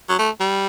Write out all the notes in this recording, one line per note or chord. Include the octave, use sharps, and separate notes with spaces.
F#3
A3
G3